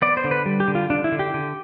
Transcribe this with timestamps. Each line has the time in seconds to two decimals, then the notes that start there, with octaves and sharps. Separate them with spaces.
0.02 B3 D5
0.17 C5
0.24 D3
0.31 B4
0.46 G3
0.60 G4
0.68 D3
0.75 F4
0.90 D3 D4
1.04 E4
1.12 D3
1.19 G4
1.34 D3